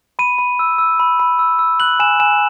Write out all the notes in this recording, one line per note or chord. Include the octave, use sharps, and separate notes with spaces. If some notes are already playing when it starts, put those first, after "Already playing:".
B5 D#7
B5
E6
E6
B5
B5
E6
E6
F#6 F#7
G#5 E7
G#5 E7